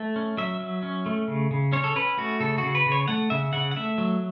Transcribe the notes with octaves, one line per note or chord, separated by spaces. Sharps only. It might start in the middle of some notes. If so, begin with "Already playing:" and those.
Already playing: A3
C#4
F#3 E5
F#3
C#4
A3
C#3
C#3
C#4 C#5
A4
C#4 B4
A3 F#4
C#3 A4
C#3 F#4
B4
C#3
C#5
A3 F#5
C#3 E5
C#3 F#5
F#5
A3 E5
F#3